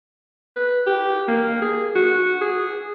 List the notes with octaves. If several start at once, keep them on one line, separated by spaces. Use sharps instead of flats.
B4
G4
A#3
G#4
F#4
G#4